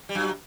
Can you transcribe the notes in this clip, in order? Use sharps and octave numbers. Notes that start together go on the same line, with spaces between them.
G3
F#2 F#3